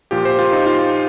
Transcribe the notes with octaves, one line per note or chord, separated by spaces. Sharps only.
A#2 F3 G4
C5
F4
D#4
F4